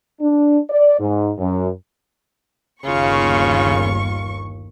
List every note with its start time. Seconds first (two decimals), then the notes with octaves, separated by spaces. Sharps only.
0.21 D4
0.70 D5
1.00 G#2
1.38 F#2
2.84 G1 D#2 C#3 F4 C#6